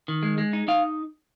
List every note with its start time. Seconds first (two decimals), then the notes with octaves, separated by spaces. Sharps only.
0.08 D#3
0.23 G#3
0.38 G#3
0.53 D#4
0.68 D#4 F5